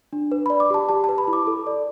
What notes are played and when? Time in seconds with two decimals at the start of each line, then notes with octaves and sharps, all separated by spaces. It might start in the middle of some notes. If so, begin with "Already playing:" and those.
0.13 D4
0.32 B4
0.46 B5
0.50 D5
0.60 D6
0.70 G4 A5
0.89 G4 A5
1.04 A5
1.09 B4
1.18 B5
1.28 E4
1.33 D6
1.47 A4
1.67 D5